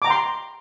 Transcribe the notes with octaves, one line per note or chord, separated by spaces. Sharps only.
G5 A#5 C6 D6